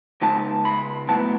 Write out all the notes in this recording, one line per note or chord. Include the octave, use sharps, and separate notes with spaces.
C#2 C#3 G#3 D#4 A5
B5
A2 F#3 B3 E4 A5